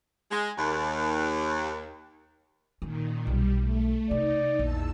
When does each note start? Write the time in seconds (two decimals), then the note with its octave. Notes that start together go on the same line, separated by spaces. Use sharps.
0.32 G#3
0.57 D#2
2.82 A#2 D#3 C#4
3.27 B1 G3
3.60 A3
4.11 C3 D#4 D5
4.59 A#1 E2 A5 E6